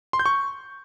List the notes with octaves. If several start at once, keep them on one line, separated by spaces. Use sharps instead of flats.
C6
G6
C#6